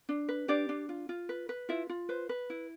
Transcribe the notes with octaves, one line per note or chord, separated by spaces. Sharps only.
D4
B4
D4 G4 D5
D4
F4
F4
B4
B4
E4 F4 E5
F4
B4 C5
B4
E4